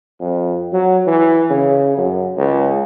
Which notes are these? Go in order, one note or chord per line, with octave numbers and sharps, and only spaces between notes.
F2
F#3
E3
C#3
F#2
C#2